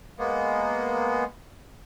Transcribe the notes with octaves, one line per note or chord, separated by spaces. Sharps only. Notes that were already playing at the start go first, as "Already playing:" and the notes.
G#3 A#3 B3